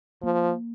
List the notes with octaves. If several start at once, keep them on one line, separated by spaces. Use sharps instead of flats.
F3 A#3